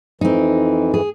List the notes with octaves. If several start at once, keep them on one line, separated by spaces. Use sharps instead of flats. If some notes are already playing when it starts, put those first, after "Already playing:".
F2 E3 C4 D#4
G#4